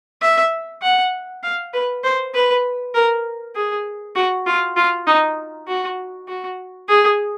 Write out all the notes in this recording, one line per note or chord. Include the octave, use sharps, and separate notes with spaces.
E5
F#5
F5
B4
C5
B4
A#4
G#4
F#4
F4
F4
D#4
F#4
F#4
G#4